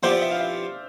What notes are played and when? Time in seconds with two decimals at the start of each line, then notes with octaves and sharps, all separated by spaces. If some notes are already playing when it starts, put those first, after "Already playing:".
0.03 F3 B3 E4 G4 C5
0.12 D5
0.22 E5
0.31 F5
0.40 E5